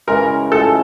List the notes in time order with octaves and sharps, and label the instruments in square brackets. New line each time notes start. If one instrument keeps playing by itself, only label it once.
[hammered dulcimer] C#3 E3 G#3 [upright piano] A#4
[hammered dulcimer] A2 F3 G#3 [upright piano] A4